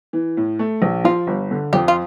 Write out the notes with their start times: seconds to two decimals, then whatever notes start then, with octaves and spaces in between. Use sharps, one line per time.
0.13 E3
0.37 A2
0.59 A3
0.82 A#1
1.04 F3 F4
1.27 G1
1.51 D3
1.73 F2 G4
1.88 F4